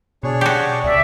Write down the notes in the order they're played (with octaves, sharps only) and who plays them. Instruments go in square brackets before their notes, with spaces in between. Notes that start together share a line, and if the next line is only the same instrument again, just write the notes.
[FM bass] B2 [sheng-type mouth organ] D4 G#4 C#5
[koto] F#4 G4
[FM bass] C#2 [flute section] D5 E5